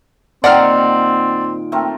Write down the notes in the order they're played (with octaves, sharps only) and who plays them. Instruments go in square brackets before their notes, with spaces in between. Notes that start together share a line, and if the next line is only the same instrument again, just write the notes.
[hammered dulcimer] A#2 D#3 [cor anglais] C4 [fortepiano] D5 [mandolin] F#5 A#5 F6
[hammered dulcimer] A3 C4 A#4